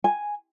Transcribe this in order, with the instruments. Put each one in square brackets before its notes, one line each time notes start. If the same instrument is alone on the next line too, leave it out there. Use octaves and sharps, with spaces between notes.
[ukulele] G#5